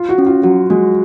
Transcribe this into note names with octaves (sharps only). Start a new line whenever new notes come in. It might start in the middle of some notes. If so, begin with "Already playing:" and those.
Already playing: F4
F#4
C#4
F4
F#3 F#4
G#3 F#4